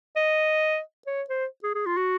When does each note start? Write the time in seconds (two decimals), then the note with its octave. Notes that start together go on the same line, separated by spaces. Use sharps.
0.16 D#5
1.06 C#5
1.30 C5
1.63 G#4
1.75 G#4
1.86 F4
1.97 F#4